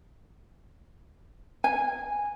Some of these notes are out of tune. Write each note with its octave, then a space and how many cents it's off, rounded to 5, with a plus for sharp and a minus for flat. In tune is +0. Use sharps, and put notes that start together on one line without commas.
G#5 -10